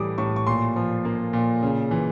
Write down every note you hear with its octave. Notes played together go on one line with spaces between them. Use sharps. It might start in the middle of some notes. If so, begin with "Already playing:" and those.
Already playing: A2 E3 G3 D6 D#6
A2 C#6
C#6
A#2 C6
F3
A#3
A#2
C#3
E3